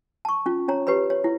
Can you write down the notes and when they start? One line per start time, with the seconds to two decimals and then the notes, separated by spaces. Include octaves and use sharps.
0.25 A5 C#6
0.46 C#4 F4
0.68 C#4 C#5 A#5
0.87 G4 B4 C#5 B5
1.10 C#5
1.24 E4